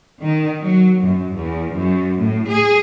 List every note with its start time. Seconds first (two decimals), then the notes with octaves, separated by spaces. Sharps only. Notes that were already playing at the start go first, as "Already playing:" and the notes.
0.22 D#3
0.63 F#3
1.03 F#2
1.35 E2
1.75 F#2
2.19 A2
2.50 G#4